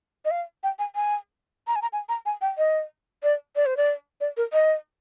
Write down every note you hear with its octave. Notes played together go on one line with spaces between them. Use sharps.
D#5
F5
G5
G#5
G#5
A#5
G#5
A#5
G#5
A#5
G#5
G5
D#5
D5
D5
C5
D5
D5
A#4
D#5